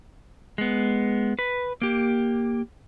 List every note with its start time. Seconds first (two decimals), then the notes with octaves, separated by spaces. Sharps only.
0.58 G#3 B3
1.39 B4
1.82 A#3 G4